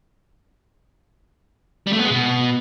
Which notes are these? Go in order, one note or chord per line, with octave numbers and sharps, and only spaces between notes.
G3
A3
B3
G#3
B2